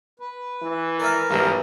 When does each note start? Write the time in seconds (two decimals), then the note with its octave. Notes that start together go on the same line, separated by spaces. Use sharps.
0.20 B4
0.62 E3
1.00 A#4 D5 E5
1.30 B1 G2 E3